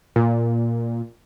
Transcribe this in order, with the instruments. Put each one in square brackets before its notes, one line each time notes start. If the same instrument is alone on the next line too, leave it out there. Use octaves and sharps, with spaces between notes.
[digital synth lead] A#2